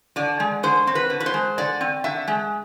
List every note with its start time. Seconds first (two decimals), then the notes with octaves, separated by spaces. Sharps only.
0.16 D3 D5
0.40 G#3
0.63 D3 C5
0.87 C4
0.95 B4
1.10 D3
1.20 B4
1.26 C5
1.34 G#3
1.58 D3 D5
1.81 C4
2.04 D3 E5
2.28 G#3